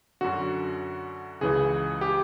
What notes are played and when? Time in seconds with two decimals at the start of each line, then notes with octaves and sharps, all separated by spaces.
0.21 F#2 D3 F#4
1.41 C#2 C#3 E3 G#4
2.01 G4